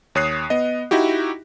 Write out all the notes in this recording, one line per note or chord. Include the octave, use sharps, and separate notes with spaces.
D#2 C#5 D#6 F#6 C7
B3 D#5
D#4 E4 F#4 G4